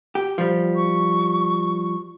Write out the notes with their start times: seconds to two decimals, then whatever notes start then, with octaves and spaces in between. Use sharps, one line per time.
0.15 G4
0.38 F3 G3
0.76 C#6